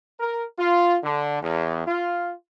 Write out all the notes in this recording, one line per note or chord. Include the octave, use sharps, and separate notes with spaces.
A#4
F4
D3
E2
F4